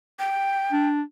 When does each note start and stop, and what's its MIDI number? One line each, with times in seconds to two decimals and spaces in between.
0.19 0.88 79
0.73 1.02 62